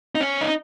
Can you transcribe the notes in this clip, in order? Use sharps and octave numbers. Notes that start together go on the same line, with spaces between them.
D#4
C#4
D#4